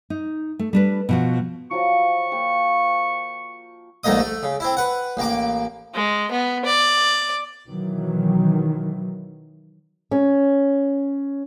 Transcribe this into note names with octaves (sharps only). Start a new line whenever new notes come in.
D#4
A3
G3 D4 B4
B2 F3 F#4
F3 F#3 D#5 C#6
A#3 G5
A#1 G#2 A3 A#3 D#5 D#6
A3
C#3
C4 E4
B4 F#5
A1 A#3 D6
G#3
B3
D5
B2 D#3 E3 F#3
C#4